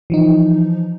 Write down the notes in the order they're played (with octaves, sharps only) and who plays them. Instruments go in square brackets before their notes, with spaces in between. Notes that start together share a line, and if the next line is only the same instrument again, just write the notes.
[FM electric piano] E3 F3 D#4